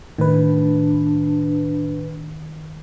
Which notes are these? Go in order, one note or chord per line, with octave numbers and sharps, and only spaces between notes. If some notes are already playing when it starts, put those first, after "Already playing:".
A2 D#3 D4 B4